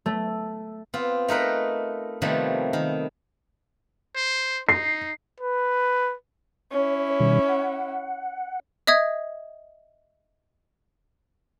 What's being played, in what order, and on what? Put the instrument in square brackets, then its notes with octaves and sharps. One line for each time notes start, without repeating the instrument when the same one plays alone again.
[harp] A3
[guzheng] B3 C4 F4
A3 D#4 A#4 B4 G5
C3 D#3 F3 G3 A3 B3
D#3
[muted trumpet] C5
[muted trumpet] D#4 [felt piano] C7
[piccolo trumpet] B4
[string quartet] C#4 E4 [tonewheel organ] C#5
[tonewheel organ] B2 D#3 G3
F#5
[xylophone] D#5 E5 D#6 G#6